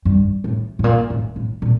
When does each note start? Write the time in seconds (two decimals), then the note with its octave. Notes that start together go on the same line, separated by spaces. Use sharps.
0.05 G2
0.44 A2
0.79 A2
0.84 A#2
1.10 A2
1.36 A2
1.62 A#2